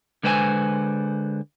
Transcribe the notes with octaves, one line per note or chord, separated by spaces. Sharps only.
D3 G#3 B4 C5 E5 G#5